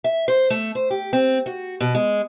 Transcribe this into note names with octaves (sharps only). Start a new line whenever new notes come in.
E5
C5
A3
C5
G4
C4
F#4
B2
G#3